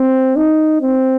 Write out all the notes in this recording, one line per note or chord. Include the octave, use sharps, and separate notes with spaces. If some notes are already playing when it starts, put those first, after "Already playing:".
Already playing: C4
D#4
C4